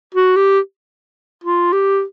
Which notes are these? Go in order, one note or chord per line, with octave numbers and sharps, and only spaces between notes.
F#4
G4
F4
G4